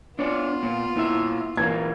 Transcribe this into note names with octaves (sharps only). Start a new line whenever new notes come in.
B3 D4 F4 C#5 D5
A#2
A#2 E4 E5
A#2 E3 A#3 G#6